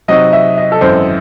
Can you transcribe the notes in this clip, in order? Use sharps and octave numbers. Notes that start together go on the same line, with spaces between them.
C3 F#3 C4 D#4 F#4 D#5
E5
D#5
A4
G#1 F#2 E3 C4 C5